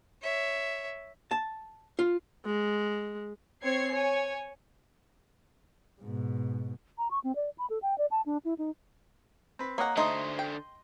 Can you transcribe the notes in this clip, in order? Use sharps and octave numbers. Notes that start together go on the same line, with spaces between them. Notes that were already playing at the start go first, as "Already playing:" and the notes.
C#5 E5
A5
F4
G#3
C4 C#5 G#6 C7
C#5 G#5
G#2 B2
A#5
C#6
C4
D5
B5
A4
G5
D5
A5
D4
E4
D#4
C4 B4
A#3 C#5 D#5 F#5 A#5
D3 A3 D#4 C5 D#5 C6 D#6
G5